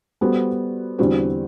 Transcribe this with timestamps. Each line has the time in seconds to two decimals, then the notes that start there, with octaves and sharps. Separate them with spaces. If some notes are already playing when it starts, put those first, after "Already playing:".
0.21 G3 B3 F#4 A4 C5
0.98 E2 D3 G3 C4 F#4